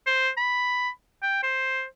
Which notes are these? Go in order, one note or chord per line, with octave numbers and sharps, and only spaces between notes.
C5
B5
G5
C5